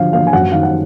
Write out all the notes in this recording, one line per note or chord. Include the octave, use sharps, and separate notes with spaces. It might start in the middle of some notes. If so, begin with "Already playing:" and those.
Already playing: D3 F3 F5
A#3 F5
G#5
F#2 F#5
D#3 F5
F#5